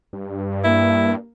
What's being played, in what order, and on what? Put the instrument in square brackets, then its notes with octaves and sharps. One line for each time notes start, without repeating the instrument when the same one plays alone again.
[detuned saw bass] G2
[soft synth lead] A#3 [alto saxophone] E4